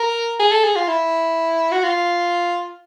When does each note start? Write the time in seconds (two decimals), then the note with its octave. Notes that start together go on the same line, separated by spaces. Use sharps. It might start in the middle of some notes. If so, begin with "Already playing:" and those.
Already playing: A#4
0.40 G#4
0.52 A4
0.64 G#4
0.76 F4
0.88 E4
1.72 F#4
1.84 F4